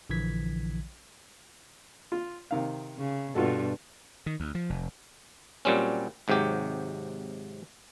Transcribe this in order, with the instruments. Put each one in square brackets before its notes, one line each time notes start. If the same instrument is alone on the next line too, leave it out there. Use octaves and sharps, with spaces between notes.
[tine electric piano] A#1 D3 E3 F3 G#6 B6
[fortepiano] F4
C3 D#3 F5
[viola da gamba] C#3
[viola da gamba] G2 B2 [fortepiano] F4 F#4 A4
[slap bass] D#3
D2
F3
F1
[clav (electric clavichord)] A#2 F#3 G3 C4 C#4
G#1 G#2 C3 F#3 G4